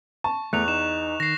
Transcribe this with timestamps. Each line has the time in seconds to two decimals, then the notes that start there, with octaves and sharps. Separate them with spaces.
0.24 A5 C#6
0.53 E2 A3 F#6 F7
0.68 D#4 E7
1.20 D#3 A#6 C7